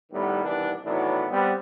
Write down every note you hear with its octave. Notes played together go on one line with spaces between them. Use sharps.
A2 D#3 G3 B3
C3 D#3 E3 G3 B3 D4
A2 D#3 E3 F#3 B3 D4
G3 B3 C4